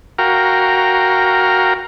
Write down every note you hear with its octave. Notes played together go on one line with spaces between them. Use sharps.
F#4 A#4 F5 G5 A#5